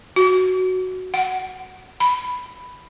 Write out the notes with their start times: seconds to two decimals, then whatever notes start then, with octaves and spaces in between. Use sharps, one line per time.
0.16 F#4
1.14 F#5
2.00 B5